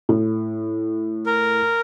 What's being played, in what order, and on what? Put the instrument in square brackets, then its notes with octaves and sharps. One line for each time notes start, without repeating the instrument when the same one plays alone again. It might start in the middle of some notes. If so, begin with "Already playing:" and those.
[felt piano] A2
[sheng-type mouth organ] A#4